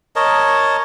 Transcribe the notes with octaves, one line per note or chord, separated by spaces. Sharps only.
A#4 C#5 D#5 A5